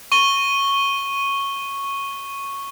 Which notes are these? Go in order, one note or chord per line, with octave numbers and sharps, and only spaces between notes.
C#6 D#7 G7